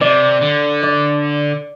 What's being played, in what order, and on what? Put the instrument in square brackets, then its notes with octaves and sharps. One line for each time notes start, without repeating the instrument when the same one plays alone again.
[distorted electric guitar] C3 [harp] D5
[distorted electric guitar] D3
[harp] D5